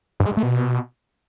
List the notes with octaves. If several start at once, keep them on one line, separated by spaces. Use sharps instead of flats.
G2
G#3
G2
A3
B2